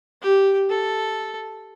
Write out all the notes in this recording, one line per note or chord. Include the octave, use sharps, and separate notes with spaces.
G4
A4